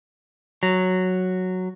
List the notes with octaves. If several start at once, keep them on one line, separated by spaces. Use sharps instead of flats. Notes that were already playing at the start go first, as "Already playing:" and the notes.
F#3